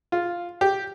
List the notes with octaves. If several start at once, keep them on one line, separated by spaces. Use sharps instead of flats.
F4
G4